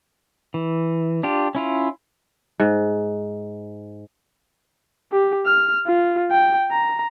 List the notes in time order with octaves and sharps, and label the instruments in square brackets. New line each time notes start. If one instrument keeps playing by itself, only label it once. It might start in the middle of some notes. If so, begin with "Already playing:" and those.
[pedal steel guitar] E3
D4 F4 G4
C#4 E4 F4
[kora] G#2
[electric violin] G4
F6
F4
G5
A#5